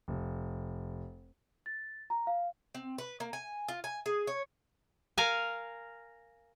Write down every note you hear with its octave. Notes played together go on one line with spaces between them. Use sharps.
F1
A6
A#5
F5
C4
B4
A#3
G#5
F4
G#5
G#4
C#5
A#4 F5 G#5